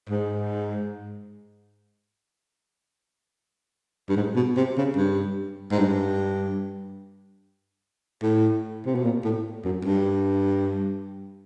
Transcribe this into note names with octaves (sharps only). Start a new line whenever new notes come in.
G#2
G2
G#2
B2
C3
C#3
G2
G#2
G2
A2
C3
B2
A#2
A2
F#2
G2